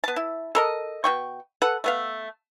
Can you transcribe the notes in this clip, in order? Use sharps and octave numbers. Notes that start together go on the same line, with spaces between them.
B3 A5
E4
A4 A#4 D#5
B2 G5 C#6
A4 B4 F#5
A3 B3 F5